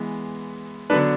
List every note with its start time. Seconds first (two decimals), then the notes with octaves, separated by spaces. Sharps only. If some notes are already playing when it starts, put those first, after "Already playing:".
Already playing: E3 G#3 B3
0.90 D3 F#3 B3 D4 B4